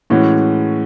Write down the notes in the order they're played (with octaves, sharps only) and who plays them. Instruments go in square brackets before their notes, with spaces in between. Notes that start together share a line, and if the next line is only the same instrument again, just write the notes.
[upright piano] A2 E3 G#3 C#4 F#4